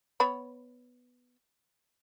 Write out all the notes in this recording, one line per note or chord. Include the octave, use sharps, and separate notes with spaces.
B3 C#5 B5